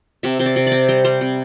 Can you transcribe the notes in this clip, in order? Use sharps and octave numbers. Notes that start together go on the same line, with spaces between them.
C3 E5
C3 C5
D5
C3
D5
C4
G3 C5
G3 C5
C3